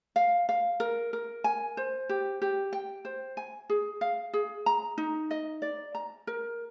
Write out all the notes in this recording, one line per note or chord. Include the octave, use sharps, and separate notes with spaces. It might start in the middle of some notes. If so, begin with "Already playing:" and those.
F5
F5
A#4
A#4
G#5
C5
G4
G4
G5
C5
G#5
G#4
F5
G#4
A#5
D#4
D#5
D5
A#5
A#4